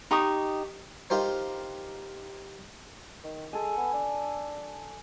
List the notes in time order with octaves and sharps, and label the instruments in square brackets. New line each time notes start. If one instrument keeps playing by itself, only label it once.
[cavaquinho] D#4 G4 C#6 D#6
[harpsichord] D#4 F4 G4 A#4 C5
[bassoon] D#3
[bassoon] G#3 [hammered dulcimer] A4 G#5
[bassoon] B3
D4